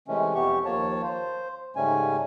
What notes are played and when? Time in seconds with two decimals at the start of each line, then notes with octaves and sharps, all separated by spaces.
0.08 C3 E3 G#3 A3 C#4
0.35 F2 B3 G4 C#6
0.65 D#2 F3 A#3 C#5 A5
1.03 C5
1.76 G#2 C#3 G3 A3 C#4 G#5